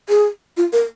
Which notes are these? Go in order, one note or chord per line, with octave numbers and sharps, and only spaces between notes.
G#4
F4
A#4